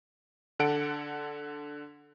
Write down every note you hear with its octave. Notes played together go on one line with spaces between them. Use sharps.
D3 A4 F#5 D7